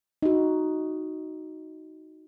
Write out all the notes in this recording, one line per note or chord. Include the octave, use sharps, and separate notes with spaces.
D#4 F#4